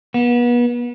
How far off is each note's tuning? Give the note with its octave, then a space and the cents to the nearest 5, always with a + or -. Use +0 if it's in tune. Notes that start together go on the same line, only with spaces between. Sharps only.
B3 -35